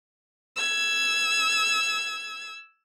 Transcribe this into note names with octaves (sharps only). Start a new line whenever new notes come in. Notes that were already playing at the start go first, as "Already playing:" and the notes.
E6 G#6